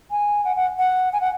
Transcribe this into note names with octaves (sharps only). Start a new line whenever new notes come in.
G#5
F#5
F#5
F#5
G#5
F#5